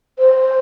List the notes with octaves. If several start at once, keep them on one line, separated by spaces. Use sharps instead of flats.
C5